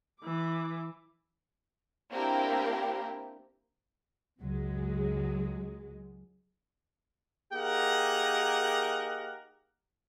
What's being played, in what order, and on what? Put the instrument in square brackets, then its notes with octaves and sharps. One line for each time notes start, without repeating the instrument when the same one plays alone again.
[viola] E3 D6
[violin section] A#3 C4 D4 E4 G4 A#4
[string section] C#2 F#2 F#3 G#3
[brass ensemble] A#3 D#4 G4 G#4 A#4 F#5